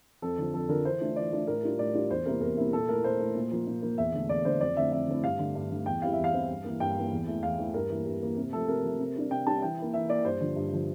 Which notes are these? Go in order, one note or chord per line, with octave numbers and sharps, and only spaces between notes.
F2 A4
D3 F3
F2 A4
D3 F3 A#4
E3 C5
A3 D4 F4
E3 D5
A3 D4 F4
A2 A#4
G3 D4 F4
A2 D5
G3 D4 F4
E2 C5
C3 G3 A#3 E4 A#4
E2 A#4
C3 G3 A#3 E4
A#2 A4
A3 E4 A#4
A#2 C5
A3 E4
A#2
F3 A#3
A#2
F3 A#3
E2 E5
D3 A3
E2 D5
D3 A3 C5
F2 D5
D3 A3 C4 E4 E5
F2 E5
D3 A3 C4 E4
G2 F5
D3 A3
G2
D3 A3
E2 G5
E3 G3 C4 E4 F5
E5
E2
F5
E3 G3 C4 E4
G2
E3 A#3
G2 G5
E3 A#3
E2
E3 A3
E2 F5
E3 A3
G2 A#4
E3 A#3
G2
E3 A#3
C3
F3 A3 A4
C3 A#4
F3 A3
C3
G3 D4
C3 G5
G3 D4 A5
E3 G5
A#3 E4
E3 E5
A#3 E4 D5
G2 C5
D3 F3
G2
D3 F3